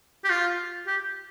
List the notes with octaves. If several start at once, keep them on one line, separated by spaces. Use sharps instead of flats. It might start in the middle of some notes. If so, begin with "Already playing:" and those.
G4
F4
G4